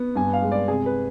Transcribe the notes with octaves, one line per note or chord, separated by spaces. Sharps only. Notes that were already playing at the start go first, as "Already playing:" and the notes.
Already playing: B3
G2 G#5
F5
G#3
D5
C3 G#4
B4